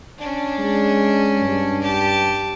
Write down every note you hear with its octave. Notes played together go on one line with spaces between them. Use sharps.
C#4 D4
G#3
G2
G4 A5